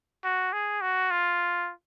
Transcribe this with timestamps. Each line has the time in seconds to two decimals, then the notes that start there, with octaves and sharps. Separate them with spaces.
0.24 F#4
0.53 G#4
0.82 F#4
1.11 F4